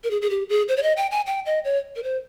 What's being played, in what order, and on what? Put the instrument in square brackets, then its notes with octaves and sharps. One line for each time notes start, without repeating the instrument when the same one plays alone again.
[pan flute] A#4
G#4
G#4
G4
G#4
C5
C#5
D#5
G5
G#5
G5
D#5
C#5
A#4
C5